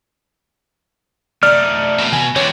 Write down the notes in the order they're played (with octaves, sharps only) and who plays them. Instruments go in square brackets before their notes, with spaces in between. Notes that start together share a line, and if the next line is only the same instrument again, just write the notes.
[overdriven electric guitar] A3 D#4 [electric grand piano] D5 [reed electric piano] F6
[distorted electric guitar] B2
[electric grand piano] G#5
[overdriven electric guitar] E3 G4 [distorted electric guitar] G#3 D4 [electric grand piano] C#5